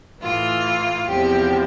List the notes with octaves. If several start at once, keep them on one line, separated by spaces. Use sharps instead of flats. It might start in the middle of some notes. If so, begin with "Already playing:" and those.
A2 E3 F4
E2 C3 F3 G4